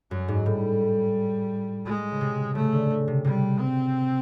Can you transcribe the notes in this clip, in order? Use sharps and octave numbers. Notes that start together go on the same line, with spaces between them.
F#2 F#3
G#2
A2 G3
G#3
C#3
C3
C#3 A3
D3
C#3
C3
C3 G3
C4